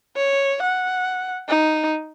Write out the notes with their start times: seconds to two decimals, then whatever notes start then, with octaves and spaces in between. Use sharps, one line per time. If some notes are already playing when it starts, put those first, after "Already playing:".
0.16 C#5
0.63 F#5
1.48 D#4